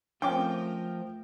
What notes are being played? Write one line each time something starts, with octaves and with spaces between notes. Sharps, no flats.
F3 A3 C4 C#4 A#4 G5 D6